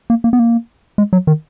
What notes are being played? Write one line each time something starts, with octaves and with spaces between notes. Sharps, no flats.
A#3
A#3
B3
A#3
G#3
F#3
D#3